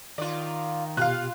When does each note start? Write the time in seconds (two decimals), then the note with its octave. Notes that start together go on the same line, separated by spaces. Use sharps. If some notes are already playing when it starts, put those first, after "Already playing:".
0.18 D#3 F4 D5
0.97 B2 F4 G4 F5 F#6